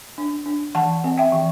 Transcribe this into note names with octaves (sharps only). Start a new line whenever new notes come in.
D4
D4
E3 F#5 A5
C4
E5 G5
E3